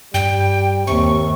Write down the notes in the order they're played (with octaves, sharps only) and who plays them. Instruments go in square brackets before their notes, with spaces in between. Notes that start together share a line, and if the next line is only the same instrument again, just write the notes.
[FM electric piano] G2 [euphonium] G3 [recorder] G5
[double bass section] D#2 [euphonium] C3 [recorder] C#6